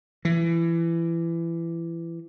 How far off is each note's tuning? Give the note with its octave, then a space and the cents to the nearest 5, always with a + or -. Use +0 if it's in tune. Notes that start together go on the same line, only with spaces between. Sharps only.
E3 +25